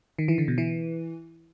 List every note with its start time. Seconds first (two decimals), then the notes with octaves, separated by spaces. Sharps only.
0.18 D#3
0.28 E3
0.38 D3
0.48 B2
0.58 E3